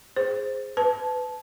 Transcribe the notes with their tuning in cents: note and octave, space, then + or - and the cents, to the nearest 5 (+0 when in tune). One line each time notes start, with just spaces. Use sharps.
G#4 +0 C5 +0
B4 +20 A5 -15